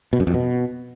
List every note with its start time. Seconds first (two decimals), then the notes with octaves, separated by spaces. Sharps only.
0.13 B2
0.20 F#2
0.27 F2
0.34 B2